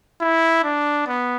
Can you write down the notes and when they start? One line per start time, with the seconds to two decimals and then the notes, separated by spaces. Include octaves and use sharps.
0.21 E4
0.64 D4
1.08 B3